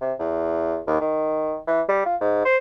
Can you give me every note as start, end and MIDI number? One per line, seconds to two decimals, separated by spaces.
0.01 0.13 48
0.19 0.80 40
0.87 0.98 39
1.01 1.58 51
1.67 1.81 52
1.89 2.02 55
2.06 2.16 65
2.21 2.41 44
2.45 2.57 72